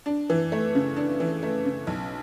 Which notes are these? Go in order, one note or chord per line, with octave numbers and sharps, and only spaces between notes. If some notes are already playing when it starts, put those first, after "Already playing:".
D4
E3
A3
C#3
D4
E3
A3
C#3
B1